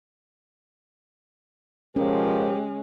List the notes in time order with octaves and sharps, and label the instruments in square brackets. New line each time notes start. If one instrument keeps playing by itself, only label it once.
[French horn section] B2 F3 A#4 [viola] G#3 [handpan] C#4 [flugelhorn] G4